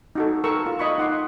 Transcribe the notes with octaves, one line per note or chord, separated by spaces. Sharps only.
D#4 F#4 A4
A4 A#4 C#6 E6
F4
D#5 B5 C#6
D#4 F#5 C6 D6